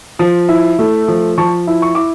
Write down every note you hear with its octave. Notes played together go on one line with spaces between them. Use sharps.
F3
E4
A3
F3
F3 A5 C#6
E4
C#6
E4 D6